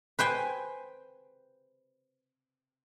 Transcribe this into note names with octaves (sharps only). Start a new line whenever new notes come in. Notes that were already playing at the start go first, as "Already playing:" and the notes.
B4 C5 G5 G#5